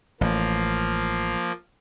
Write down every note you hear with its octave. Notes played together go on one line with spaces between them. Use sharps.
A1 F3 A#3